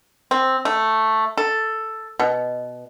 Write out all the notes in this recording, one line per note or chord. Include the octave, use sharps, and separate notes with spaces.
C4
A3
A4
B2